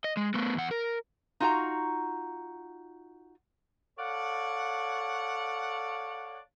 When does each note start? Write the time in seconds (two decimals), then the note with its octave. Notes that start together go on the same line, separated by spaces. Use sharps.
0.04 D#5
0.17 G#3
0.34 A3 B3
0.55 E2 F#5
0.71 A#4
1.40 D#4 F4 F#4 F#5 A#5
3.98 A4 C#5 D5 F5 F#5